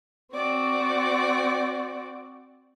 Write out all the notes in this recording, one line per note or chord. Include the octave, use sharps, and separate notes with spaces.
C4 F#4 D5